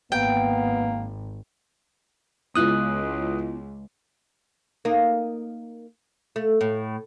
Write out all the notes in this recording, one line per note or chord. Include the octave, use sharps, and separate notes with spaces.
G#1 A#3 B3 G5
C#2 B3 E4 F4 D#6 F#6
A#3 D#4
A3
A2